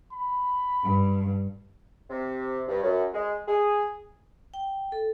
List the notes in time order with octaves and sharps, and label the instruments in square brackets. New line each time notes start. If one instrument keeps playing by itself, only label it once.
[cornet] B5
[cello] G2
[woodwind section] C3
G2
F#2
G#3
G#4
[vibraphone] G5
A4